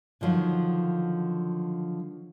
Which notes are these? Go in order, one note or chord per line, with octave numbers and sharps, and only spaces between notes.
D3 D#3 F3 F#3